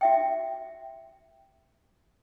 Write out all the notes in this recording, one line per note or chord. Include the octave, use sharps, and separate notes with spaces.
F#4 E5 G5